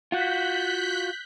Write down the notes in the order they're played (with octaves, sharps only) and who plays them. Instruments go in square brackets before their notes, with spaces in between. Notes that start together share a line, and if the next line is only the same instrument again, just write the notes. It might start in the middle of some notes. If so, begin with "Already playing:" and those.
[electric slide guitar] F4 F#4 [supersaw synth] F#6 G6 B6